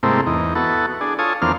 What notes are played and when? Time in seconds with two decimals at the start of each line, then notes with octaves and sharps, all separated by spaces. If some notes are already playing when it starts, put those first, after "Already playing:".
0.03 G#2 C3 A3 A#3 C4 E4
0.26 E2 D#4
0.55 B3 E4 F#4 A4
1.01 D4 G#4
1.19 F4 A4 C#5 G#5 D#6
1.42 E2 F3 A#3 C4 D4 F6